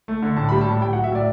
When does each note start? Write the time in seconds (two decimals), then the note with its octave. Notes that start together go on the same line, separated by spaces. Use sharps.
0.08 A3
0.22 D3
0.37 A2 A5
0.49 G3 B5
0.61 A5
0.67 A2
0.82 A2 G5
0.93 F#3 F#5
1.04 E5
1.12 A2 D5